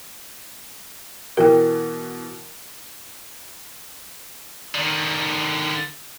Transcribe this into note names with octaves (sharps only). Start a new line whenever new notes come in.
B2 E3 A#4 G5
D3 D#3